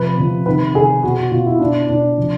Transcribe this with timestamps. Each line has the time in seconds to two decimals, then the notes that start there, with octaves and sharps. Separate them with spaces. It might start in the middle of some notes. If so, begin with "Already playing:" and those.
Already playing: C3 F3 B4
0.18 C3 F3
0.46 C3 D#3 B4
0.75 C3 D#3 G#4
1.03 B2 F#4
1.17 F#4
1.31 B2 F4
1.46 E4
1.60 B2 D4
1.89 B2 D4
2.17 C3 F3